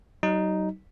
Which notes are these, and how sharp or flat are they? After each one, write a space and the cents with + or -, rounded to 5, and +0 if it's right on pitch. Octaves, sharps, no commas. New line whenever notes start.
F#3 +45 D#4 +0